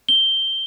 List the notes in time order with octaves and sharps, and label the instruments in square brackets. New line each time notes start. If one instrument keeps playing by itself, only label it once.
[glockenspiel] G7